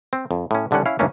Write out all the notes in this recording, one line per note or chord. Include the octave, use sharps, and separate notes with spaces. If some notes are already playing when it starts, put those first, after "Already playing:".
C4
F2
A2 C#4
C2 D3 G3 C#4 F#5
C#4 E4 F5
G1 D#2 A3 A#3 C#4 D4